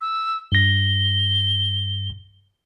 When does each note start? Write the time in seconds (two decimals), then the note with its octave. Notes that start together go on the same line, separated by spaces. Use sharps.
0.01 E6
0.52 G2 A#6 G7